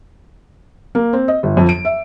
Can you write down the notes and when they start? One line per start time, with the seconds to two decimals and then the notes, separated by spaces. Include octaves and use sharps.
0.95 A#3
1.13 C4
1.28 D#5
1.43 G1
1.57 F2
1.69 D7
1.85 E5